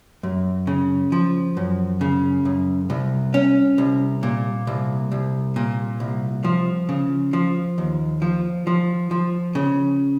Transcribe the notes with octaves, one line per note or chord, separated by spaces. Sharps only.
F#2
C#3
F3
F#2
C#3
F#2
C2
C#4
C2
A#2
C2
C2
A#2
C2
F3
C#3
F3
D#2
F3
F3
F3
C#3